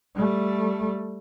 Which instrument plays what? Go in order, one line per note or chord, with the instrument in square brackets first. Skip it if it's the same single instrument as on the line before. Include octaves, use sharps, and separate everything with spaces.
[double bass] G3 A3